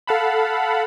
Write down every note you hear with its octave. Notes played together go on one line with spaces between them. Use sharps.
A4 F5 F#5 A5 B5